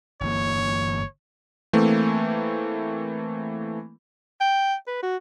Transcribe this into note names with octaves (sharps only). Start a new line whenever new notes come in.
G1 E3 A#3 C#5
E3 A3 A#3 C4
G5
B4
F#4